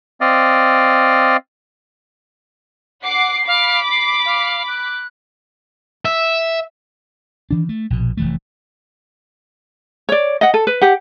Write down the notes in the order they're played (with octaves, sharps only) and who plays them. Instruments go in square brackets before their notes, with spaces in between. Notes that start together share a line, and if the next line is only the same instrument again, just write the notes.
[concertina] C4 D5 D#5 F5
[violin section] F#5 D6 C7
[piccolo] F5 [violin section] B5 D6
[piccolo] C7
F5
F#6
[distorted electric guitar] E5
[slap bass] D#3 E3 D4
A3
A#1 B2
F1 E3 A3
[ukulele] C#5 D5
D#5 F#5
A4
B4
G4 F#5